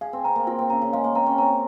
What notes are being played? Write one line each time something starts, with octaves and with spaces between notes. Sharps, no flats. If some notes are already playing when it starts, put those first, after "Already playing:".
G#4 F5
C4
C4 A#5
A#3
C4 F4
C4
C#3 A#5
C#3
G#3 F5
A#3
C4 A#5
C#4
C4 A#5